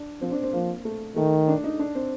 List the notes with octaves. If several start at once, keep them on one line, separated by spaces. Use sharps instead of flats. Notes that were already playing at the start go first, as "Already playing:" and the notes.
Already playing: D4
F3 C4
D4
C4
F3 A#3
A3
D#3 A3
D4
D#4
D4
C4